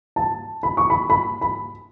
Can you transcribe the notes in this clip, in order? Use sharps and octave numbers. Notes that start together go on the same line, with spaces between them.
A5
B5
C#6
B5
B5
B5